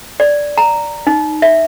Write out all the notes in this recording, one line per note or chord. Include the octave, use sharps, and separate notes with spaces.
D5
A#5
D#4
E5